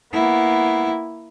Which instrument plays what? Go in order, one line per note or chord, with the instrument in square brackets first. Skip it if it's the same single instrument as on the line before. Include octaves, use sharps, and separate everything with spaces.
[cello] A#3 E4 [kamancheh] B3